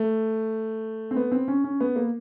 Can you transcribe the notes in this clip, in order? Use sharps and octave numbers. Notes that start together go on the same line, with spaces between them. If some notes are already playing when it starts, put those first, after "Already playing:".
Already playing: A3
C4
B3
C4
C#4
C#4
B3
A#3